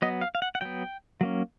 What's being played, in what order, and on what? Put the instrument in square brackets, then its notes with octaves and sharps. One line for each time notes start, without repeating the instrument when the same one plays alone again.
[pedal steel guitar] F#3 B3 D#5
F5
F5
F#5
F#5
F#3 B3 G5
F#3 A#3 C#4